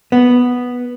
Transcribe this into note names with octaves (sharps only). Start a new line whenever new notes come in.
B3